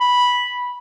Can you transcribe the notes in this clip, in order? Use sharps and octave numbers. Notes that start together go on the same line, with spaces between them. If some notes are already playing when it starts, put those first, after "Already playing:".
B5